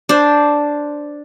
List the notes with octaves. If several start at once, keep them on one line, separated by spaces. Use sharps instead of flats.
D4 C5